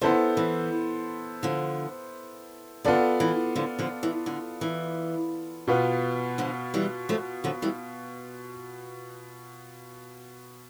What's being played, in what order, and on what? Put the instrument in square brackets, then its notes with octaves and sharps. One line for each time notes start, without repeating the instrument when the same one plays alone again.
[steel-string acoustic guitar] D3 F3 [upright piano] B3 E4 A4 C5
[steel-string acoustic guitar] E3
D3 F3
[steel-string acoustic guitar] D3 [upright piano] B3 F4 A4 D5
[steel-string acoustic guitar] E3
D3 F3
D3 F3
E3
D3
E3
[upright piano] B2 B3 F4 B4
[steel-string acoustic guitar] D3 F3
E3 G3
F3 A3
D3 F3
E3 G3